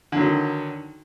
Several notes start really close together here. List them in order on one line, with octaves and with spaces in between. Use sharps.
D3 F#3 D#3